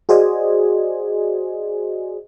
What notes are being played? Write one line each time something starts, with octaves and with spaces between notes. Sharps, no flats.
F#4 G#4 C5 D5 D#5 G#5